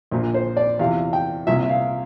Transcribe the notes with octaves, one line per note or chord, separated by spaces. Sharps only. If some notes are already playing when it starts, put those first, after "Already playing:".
A#1 A#2 F3
C5
D5
E2 C3 F3 F5
G5
C2 A#2 F3 E5
E5
F5